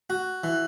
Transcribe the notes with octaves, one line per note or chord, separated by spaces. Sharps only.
F#4
E3